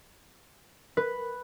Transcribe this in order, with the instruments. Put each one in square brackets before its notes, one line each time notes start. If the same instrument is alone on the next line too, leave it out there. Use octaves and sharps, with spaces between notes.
[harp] B4